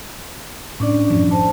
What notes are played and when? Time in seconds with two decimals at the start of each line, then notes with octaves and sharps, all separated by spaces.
0.80 A2 C#4 D4 D5
1.10 F#2 A2 F3
1.31 C5 A5